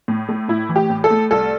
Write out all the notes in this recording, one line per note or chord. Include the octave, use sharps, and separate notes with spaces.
A2
A3
A2 E4
E3
G4
A2
A4
A3
C2 A4